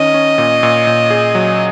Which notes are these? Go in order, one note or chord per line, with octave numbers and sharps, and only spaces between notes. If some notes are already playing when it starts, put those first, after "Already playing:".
Already playing: D#3 C#4 D#5
C#4
A#2
A#2
A#2
G#4
F#3